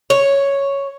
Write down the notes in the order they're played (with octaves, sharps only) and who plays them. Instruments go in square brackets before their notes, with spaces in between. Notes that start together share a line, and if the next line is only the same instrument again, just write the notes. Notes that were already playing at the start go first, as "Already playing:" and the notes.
[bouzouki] C#5